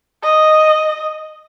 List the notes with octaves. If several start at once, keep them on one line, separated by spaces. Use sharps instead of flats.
D#5